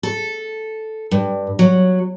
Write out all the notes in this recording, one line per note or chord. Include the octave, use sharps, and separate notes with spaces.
A4
G2
F#3